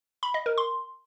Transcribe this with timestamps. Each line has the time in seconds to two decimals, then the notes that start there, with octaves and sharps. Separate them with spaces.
0.23 B5
0.34 D#5
0.46 A#4
0.58 C6